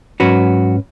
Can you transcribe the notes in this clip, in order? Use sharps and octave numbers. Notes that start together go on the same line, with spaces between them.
G#2 F#3 C#4 F#4 B4